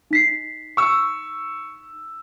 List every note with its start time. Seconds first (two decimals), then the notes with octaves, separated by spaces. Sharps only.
0.11 D#4 B6 C7
0.77 C#6 E6